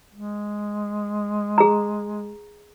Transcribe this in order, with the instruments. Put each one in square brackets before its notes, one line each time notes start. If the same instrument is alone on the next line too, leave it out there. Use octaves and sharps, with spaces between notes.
[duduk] G#3
[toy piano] G#4 A#5